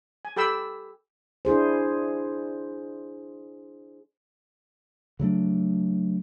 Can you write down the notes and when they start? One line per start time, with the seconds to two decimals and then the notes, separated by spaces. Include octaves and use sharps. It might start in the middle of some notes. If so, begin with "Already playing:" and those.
0.25 G#5
0.36 G4 A4 G5 B5 E6
1.45 D4 E4 G#4 C5
5.19 C#3 F#3 A3 D4